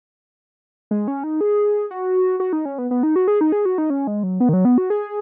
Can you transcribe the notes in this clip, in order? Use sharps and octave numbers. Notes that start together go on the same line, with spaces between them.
G#3
C#4
D#4
G#4
F#4
F#4
D#4
C#4
B3
B3
D#4
F#4
G#4
D#4
G#4
F#4
D#4
C#4
G#3
F#3
B3
D#3
F#3
B3
F#4
G#4